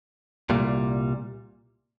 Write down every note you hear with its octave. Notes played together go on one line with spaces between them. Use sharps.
C2 A#2 G3